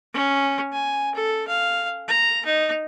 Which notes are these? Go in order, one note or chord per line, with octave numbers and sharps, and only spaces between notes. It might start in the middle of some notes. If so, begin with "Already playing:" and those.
C#4
G#5
A4
F5
A#5
D#4